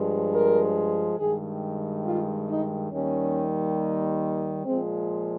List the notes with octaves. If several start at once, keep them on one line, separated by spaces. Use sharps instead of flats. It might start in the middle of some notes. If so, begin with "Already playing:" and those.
Already playing: G2 F3 G#3
A#4
G2 D#3 G#3 G#4
F4
D#4
D#2 D#3 G3 C#4
A#2 F3 G#3 C4